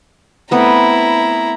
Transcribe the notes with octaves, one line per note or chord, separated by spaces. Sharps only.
A3 B3 C4 E4 A#5